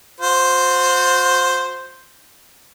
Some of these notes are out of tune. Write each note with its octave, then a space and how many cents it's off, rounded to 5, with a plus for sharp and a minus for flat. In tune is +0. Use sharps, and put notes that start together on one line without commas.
F#4 -40 C5 +0